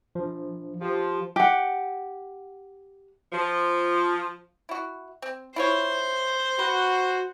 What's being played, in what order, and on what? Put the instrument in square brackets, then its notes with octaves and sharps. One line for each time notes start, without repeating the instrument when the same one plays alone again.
[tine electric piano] F3 D4
[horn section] F3 [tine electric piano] G4
[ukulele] G4 F#5
[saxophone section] F3
[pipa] E4 F#4
C4
[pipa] E4 F4 C#5 [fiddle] C5
[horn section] F#4 [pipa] B4